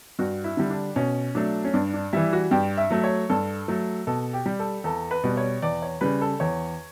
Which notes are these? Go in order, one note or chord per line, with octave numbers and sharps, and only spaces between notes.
G2 F#4
E4
D3 G3
D4
B2 C#4
F#3 A3 D4
C#4
G2 D4
D4
E3 G3 E4
F#4
G2 G4
E5
F#3 A3
C#5
G2 A4
F#3 A3
B2 A4
G4
G3
A4
E2 A4
B4
B2 G3
C#5
E2 D5
C#5
C#3 G3 B4
A4
E2 C#5